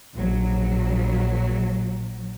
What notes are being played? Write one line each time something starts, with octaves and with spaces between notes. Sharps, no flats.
A#1 F#3